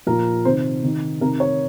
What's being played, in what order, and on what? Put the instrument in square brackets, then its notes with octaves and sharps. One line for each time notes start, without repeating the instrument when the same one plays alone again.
[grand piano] A#2 F3 A#4
C3 D#3 C5
C3 D#3
C3 D#3 A#4
C#5